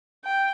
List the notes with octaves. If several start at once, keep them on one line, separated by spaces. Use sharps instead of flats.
G5